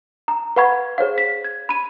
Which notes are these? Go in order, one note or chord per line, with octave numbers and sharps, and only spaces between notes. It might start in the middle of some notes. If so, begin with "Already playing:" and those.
A#5
B4 F5 F#5 B5 C#6 G#6
G#4 C5 C#5 F5
B6
G#6
B5 D#7